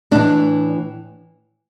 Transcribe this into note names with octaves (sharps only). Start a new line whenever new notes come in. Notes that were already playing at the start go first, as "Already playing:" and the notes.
A2 E3 D4